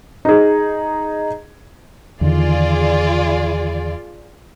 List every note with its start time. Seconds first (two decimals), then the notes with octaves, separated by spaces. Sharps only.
0.25 D#4 G#4
2.21 E2 D3 D#3 F4 G#4 D5